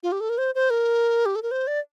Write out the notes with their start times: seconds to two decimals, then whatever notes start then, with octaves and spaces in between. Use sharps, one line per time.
0.03 F4
0.12 G4
0.21 A4
0.29 A#4
0.38 C5
0.55 C5
0.70 A#4
1.26 G4
1.36 A4
1.43 A#4
1.51 C5
1.67 D5